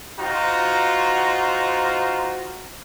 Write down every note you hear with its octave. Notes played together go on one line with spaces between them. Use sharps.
D#4 F4 F#4 C5 A#5